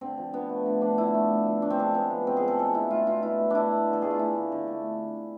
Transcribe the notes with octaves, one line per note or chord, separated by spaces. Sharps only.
D3 C4
F3
D3 B3
A3
D3
F3 D4
D3 E4
A3
A2
F3
A2 D4
C4
G#3 D4
A2 B3
F3
A2 C4
G#4
G#3 A4
B2 A4
A3 E4
A3 F4
B2 F4
B2 E4
A3
A3 D4 E4
B2
D3
A4
A3 G#4
F4
A3 E4
D3
D3
A3